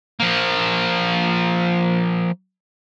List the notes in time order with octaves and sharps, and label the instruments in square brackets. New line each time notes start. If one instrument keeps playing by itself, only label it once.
[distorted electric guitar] F3 A#3